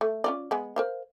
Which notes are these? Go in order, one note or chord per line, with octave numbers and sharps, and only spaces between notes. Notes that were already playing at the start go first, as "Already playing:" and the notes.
A3
C#4 F4 D5
G#3 B3
A#4 C5 F5